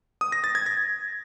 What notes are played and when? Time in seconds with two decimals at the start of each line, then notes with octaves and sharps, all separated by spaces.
0.21 D#6
0.32 A#6
0.44 A6
0.55 G#6
0.66 A#6